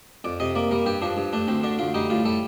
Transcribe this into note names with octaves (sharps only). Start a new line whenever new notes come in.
F2 D5
C3 D#5
A#3 D5
G3 A#4
G2 G4
F3 D4
G2
A3 D4
D2 C4
D3 D4
D2 F4
G3 D#4
A2 F4
G3 A4